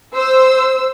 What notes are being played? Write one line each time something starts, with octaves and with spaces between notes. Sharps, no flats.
C5 E6